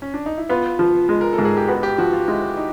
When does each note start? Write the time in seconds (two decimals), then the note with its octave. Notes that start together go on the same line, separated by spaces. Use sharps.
0.02 C#4
0.14 D4
0.26 D#4
0.38 E4
0.49 B3 F4
0.79 F3
1.09 G#3
1.21 A#4
1.33 A4
1.38 G#2
1.45 G#4
1.57 G4
1.68 B3 F#4
1.83 G4
1.98 F3 F#4
2.13 F4
2.28 G#3 E4
2.57 D#4